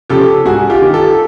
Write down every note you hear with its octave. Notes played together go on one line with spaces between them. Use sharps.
C#3 F3 G4 A4
G#2 F#4 G#4
F4 G4
D#3
G4 A4